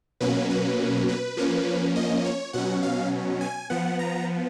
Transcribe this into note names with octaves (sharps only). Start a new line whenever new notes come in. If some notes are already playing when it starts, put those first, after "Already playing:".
B2 F#3 A#3 C#4 B4
B4
B4
F3 A#3 C#4
D#5
C#5
B2 F#3 C#4 F#5
F5
G#5
F3 B3 F#5
A#5